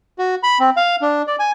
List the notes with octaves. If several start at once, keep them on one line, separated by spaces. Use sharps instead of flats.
F#4
B5
C4
F5
D4
D5
G#5